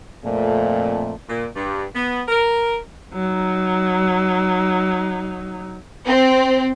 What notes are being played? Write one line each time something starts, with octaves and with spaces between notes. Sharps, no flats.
F2 A#2 A3
A#2
G2
B3
A#4
F#3 D#4
C4